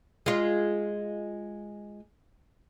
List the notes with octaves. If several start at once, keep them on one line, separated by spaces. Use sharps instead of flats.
G#3 F4